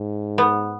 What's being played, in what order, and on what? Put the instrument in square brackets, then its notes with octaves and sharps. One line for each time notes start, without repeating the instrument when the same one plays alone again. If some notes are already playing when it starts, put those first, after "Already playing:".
Already playing: [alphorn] G#2
[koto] B3